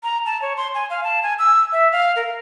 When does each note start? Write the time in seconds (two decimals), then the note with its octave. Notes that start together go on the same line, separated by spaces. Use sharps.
0.03 A#5
0.26 A5
0.42 C#5
0.57 C6
0.75 G#5
0.90 F5
1.04 A5
1.23 G#5
1.39 E6
1.72 E5
1.92 F5
2.16 A#4